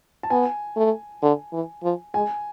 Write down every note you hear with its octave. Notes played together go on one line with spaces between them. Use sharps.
A5
B3 G#5
A3
D3
E3
F3
G#3 G#5